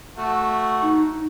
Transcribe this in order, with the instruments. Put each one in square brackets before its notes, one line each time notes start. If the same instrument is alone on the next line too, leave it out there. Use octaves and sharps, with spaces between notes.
[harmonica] A3 F#4
[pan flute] D#4